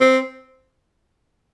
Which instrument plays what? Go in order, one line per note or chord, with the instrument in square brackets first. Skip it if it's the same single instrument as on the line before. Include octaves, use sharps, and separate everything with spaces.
[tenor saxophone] C4